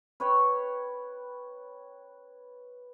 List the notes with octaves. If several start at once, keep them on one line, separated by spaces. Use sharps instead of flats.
B4 C#5 G5